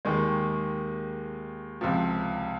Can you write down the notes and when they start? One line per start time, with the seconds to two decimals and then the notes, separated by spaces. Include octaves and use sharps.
0.05 D#2 D#3 G#3
1.81 C#2 C3 F3